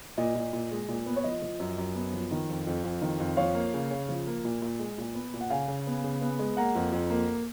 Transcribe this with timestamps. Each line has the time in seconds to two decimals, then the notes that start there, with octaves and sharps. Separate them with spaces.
0.18 A#2 D#5
0.36 A#2
0.53 A#2
0.71 G#3
0.89 A#2
1.06 B3
1.16 C#5
1.24 F3 D#5
1.42 F3
1.60 F#2
1.78 F#2
1.95 B3
2.13 F3
2.31 D#3
2.49 F2
2.67 F2
2.83 F2
3.01 D#3
3.20 F2
3.37 F3 C#5 F5
3.55 A#3
3.74 C#3
3.90 C#3
4.09 F3
4.27 A#3
4.45 A#2
4.62 A#2
4.79 G#3
4.98 A#2
5.15 B3
5.33 A#2
5.41 F#5
5.50 C#3 F5 G#5
5.68 C#3
5.87 B3
6.04 C#3
6.21 B3
6.39 G#3
6.57 A#3 F#5 A#5
6.75 F2
6.92 F2
7.10 A#3